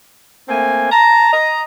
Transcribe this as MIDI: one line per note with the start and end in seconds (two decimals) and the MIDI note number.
0.49 0.87 57
0.49 0.87 58
0.49 0.87 60
0.49 0.87 80
0.91 1.32 81
0.91 1.32 82
1.32 1.61 75
1.32 1.61 82